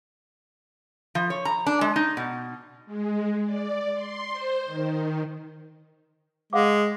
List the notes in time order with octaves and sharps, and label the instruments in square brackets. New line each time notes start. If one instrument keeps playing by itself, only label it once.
[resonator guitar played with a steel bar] F3
C#5
A#5
D4
G#3
D#4
B2
[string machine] G#3
D5
C6
C5
D#3
[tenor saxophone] G#3 [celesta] F5 F#5 D6